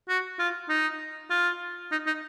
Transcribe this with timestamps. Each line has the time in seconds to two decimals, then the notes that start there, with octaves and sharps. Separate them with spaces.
0.09 F#4
0.39 F4
0.69 D#4
1.30 F4
1.92 D#4
2.07 D#4